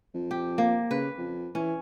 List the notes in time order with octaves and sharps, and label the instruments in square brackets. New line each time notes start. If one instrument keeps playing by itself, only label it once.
[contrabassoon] F2
[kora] G4
A#3
[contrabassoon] C#3 [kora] B4
[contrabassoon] F2
[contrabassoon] E3 [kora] C#4